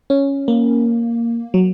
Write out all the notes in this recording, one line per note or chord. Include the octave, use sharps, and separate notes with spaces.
C#4
A#3
F#3